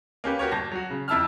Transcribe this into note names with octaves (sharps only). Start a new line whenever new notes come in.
A#3 C#4 G4 B4
F#4 G4 A#4 C#5
G1 A5 A#6
F#3 F#4
C#3
F2 E4 A5 E6 F6